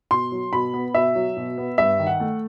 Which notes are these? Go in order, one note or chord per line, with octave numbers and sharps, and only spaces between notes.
B2 C6
F#3
B2 B5
B3
B2 E5
F#3
B2
B3
G2 E5
D#3
F#5
A3